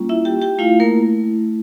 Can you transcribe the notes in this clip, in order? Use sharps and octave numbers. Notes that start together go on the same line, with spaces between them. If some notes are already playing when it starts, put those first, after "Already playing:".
Already playing: G3 A#3 C#4 F4
E4 E5
G4 G5
G4 G5
A3 E4 F4 F5
A#3 A#4